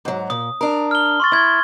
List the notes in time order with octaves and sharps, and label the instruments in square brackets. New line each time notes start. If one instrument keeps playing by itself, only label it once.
[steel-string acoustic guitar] G#2 F#3
[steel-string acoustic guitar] A#2 [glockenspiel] D#6
[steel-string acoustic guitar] D4 A#4
[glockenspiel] F6 G7
C6 C#6 A6
[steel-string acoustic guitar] E4 [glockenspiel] C6 G#6